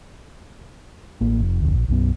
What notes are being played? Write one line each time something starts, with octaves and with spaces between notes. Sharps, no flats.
A1 A#3
F1
F1 D2
A#1
B1 F#2 B3